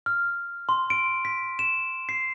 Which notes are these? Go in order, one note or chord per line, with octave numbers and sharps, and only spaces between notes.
F6
C6
D7
B6
E7
C7